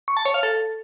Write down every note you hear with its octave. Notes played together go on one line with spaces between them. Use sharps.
C#6
A5
C#5
F5
A4